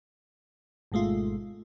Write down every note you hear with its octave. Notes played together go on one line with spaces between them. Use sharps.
G#1 B2 G#3 A3 F4